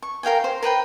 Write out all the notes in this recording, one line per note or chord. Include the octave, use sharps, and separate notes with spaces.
C#6
A#4 F5 G5 G#5
C5
A#4 B4 G5 B5